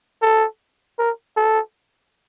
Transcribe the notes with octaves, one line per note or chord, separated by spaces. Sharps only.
A4
A#4
A4